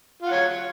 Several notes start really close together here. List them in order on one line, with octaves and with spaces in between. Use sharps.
F4 F#5 C#5